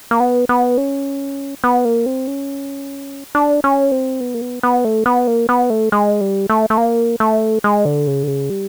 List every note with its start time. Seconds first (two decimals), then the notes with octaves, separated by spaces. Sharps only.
0.11 A#3
0.20 B3
0.49 B3
0.78 C#4
1.64 B3
1.85 A#3
2.06 C4
2.27 C#4
3.35 D4
3.64 C#4
3.92 C4
4.20 B3
4.34 A#3
4.41 B3
4.63 B3
4.85 A3
5.06 B3
5.27 A#3
5.49 B3
5.70 A3
5.92 G#3
6.21 G3
6.50 A3
6.70 A3
6.77 A#3
7.20 A3
7.64 G#3
7.85 D3
8.07 C#3
8.23 D3
8.28 C#3
8.50 G3